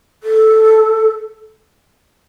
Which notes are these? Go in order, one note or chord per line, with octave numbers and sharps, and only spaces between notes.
A4